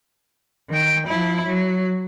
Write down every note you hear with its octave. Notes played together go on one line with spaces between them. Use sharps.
D#3 G5
F3 E4
F#3